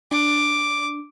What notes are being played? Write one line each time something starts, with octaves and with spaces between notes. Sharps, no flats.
D4 D6